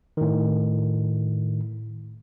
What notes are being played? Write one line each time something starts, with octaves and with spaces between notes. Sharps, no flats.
A2 D#3